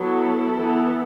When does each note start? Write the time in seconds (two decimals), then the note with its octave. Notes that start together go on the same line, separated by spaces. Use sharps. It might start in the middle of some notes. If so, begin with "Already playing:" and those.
Already playing: F#3 B3 E4 A4
0.55 E3 B3